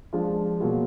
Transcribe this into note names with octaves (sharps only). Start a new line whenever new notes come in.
F3 G#3 D4 F4 G#4
B2 F#3 A#3 F4 G#4